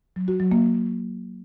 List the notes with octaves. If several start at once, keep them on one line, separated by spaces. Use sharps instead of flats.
F#3
F#4
F#3
A#3